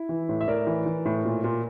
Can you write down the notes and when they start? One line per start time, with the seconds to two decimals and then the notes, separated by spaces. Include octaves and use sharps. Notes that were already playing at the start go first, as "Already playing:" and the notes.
Already playing: E4
0.09 E3
0.29 A2
0.41 E5
0.48 A2 A#4 D5
0.67 E3
0.86 E3
1.05 A2
1.25 A#2
1.44 A#2